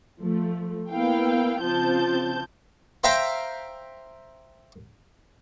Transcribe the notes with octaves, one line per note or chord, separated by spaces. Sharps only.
F3 A3
A#3 B3 E4 F5 G5
C#3 F3 C4 F4 A5 G6
C5 E5 F5 G5 A#5